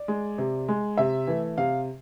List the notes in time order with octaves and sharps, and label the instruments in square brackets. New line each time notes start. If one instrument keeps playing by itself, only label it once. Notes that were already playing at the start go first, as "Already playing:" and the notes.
Already playing: [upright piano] D5
G#3
C3
G#3
C3 E5
E3 A3
C3 F5